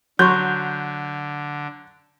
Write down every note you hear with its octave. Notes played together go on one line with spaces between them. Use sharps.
D3 F#3 C6 C#6 G6